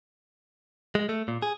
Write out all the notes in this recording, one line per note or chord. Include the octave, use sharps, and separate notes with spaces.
G#3
A3
A#2
G#4